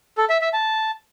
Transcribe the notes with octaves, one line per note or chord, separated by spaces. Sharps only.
A4
E5
E5
A5